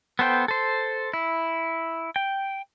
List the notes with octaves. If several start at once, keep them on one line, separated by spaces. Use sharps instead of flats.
B3 A4 C5 G5
A4 C5
E4
G5